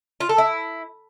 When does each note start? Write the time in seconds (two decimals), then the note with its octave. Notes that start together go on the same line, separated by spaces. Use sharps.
0.20 F4
0.29 A4
0.38 E4